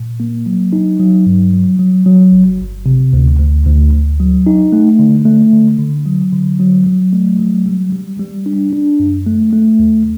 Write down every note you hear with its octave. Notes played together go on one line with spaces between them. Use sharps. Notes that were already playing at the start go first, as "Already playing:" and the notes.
Already playing: A#2
A#3
F#3
D#4
F#3
G2
F#3
F#3
F#3
G1
G1
C3
D2
D2
D2
D2
F#3
D#4
A3
D3
A3
D3
D3
F#3
D3
F#3
F#3
A3
F#3
G3
G3
G3
D4
D4
F#2
A3
A3
D#2